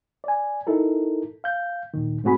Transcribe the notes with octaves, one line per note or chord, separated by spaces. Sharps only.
D5 G#5
D#4 E4 A4 A#4
F5 G6
D#2 A#2 D#3
G#2 A3 C4 F#4 G#4 B5